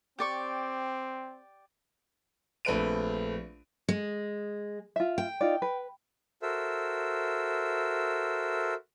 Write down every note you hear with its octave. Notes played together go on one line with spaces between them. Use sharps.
C4 G4 D5 C#6
A#1 A3 C4 B4 D7 D#7
G#3
F4 E5
G5
D#4 F4 D5
B4
F#4 A4 A#4 C5 E5